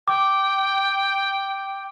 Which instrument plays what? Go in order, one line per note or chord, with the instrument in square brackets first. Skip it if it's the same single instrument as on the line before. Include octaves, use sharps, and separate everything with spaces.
[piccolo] G5 [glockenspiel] D6